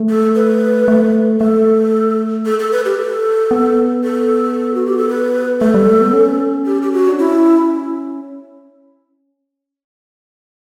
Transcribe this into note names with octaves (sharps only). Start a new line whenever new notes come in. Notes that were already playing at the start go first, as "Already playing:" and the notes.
Already playing: A3
A4
B4
A3
A3 A4
A4
A4
B4
G4
A4
B3
A4
F#4
G4
A4
B4
A3 A4
G3
A3
B3
C#4
G4
G4
F#4
D4
C#4 E4